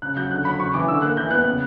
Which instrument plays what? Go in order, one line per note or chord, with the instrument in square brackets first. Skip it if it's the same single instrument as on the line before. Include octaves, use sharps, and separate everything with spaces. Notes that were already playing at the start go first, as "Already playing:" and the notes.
[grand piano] C#3 F#6
F#3 G6
D3 F#6
F#3 B5
C#3 C#6
E3 D6
D3 E6
A#3 F#6
E3 G6
B3 F#6
C#3